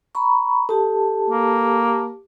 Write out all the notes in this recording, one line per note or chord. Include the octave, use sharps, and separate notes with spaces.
A#5 B5 C#6
G4 A4 A5
A#3